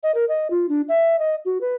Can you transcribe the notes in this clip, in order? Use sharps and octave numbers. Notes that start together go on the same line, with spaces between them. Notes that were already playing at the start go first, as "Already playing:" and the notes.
D#5
A#4
D#5
F4
D4
E5
D#5
F#4
B4